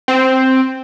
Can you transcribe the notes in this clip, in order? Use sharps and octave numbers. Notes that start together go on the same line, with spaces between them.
C4